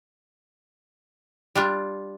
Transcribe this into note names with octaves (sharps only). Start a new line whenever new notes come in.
G3 D4 F4